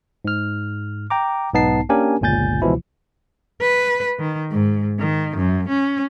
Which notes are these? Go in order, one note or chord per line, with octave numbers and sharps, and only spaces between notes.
G#2 F6
G5 A#5 D6
B1 G#2 B3 D#4 A5 C7
A#3 C#4 D4 G4 A#4 G#5
G1 C#2 A#2 G#5 G6 A6
C#2 B2 E3 F3 E4
B4
D#3
G#2
D#3
F#2
C#4